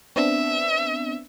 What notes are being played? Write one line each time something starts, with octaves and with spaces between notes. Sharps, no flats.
B3 C4 D4 E5